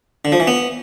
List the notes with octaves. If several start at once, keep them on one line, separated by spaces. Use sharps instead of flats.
D3
F3
E3
B3